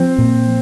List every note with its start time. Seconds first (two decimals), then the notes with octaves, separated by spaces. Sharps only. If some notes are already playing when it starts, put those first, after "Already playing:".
Already playing: F3 C4
0.18 A#2